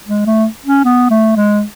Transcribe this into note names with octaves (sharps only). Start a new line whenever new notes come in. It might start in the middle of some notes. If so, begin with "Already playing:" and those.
G#3
A3
C#4
B3
A3
G#3